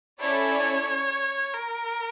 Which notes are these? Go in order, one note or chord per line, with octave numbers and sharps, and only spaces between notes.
C#4 E4 A4 C#5 D5
A#4